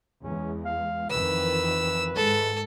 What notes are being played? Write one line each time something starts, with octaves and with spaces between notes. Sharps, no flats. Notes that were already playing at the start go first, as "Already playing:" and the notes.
E2 G#3 C#4
F5
F2 D#3 E3 B4 E6
G#2 G#3 A4